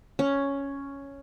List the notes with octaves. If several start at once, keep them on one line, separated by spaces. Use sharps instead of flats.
C#4